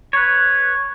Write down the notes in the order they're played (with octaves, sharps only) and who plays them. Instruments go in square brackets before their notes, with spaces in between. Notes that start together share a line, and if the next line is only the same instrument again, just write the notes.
[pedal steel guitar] B4 C#5